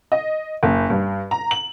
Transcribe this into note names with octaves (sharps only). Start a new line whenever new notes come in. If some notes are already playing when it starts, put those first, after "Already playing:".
D#5
F#1
G2
A#5
F#7